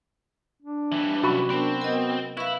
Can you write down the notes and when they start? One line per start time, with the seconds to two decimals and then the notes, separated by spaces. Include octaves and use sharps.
0.62 D4
0.92 E3 G3
1.23 C3 F#3 C#4 F#4 B5 C#6
1.50 B3 C4 D4 A#4
1.81 B3 A#4 D#5
2.37 E4 B4 F5 C#6